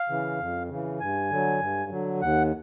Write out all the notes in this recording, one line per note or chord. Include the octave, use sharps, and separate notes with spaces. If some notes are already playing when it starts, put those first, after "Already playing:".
Already playing: F5
C#3 E3
F2
C#3 E3
G2 G#5
D3 F#3
G2
D3 F#3
D#2 F#5